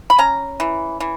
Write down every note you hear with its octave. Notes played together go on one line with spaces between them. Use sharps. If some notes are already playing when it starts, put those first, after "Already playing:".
B5
C#4 A#5
E3
E3